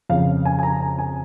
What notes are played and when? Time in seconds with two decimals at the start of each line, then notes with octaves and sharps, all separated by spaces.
0.09 F2 C#3 F5
0.45 G#5
0.59 G#5
0.63 A#5
0.81 A#5
0.99 G#5